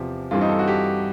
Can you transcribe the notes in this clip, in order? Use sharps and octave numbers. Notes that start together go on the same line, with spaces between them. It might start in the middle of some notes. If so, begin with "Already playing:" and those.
Already playing: E2 C3 F3 G4
G2 E3 G3 C4 F4
D#4
A4
F#4
G4